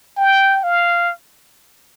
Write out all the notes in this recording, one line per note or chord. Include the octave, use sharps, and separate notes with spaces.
G5
F5